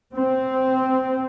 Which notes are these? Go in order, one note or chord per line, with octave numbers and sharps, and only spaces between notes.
C4